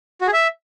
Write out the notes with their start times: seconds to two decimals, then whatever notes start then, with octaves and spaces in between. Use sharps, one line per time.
0.21 F#4
0.27 G#4
0.33 E5